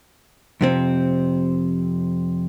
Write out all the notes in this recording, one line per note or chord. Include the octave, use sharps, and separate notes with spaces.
F2 C3 C4